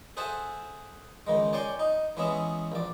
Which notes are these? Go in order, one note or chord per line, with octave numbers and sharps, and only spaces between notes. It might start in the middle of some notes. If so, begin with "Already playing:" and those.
G#4 A4 C5 E5 F#5 G#5
C#2 D#3 G#3
C#5 D5 G5 G#5 C6 C#6
D#4
E3 G#3 B3 C#4 G#4 E5
A#1 D5